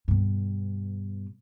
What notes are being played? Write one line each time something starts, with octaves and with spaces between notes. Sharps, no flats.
G2 B2